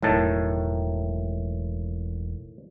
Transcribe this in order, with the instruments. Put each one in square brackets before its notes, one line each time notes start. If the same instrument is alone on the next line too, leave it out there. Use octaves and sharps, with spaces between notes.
[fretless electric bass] E1 F#3 [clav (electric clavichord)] A2 D#3 A5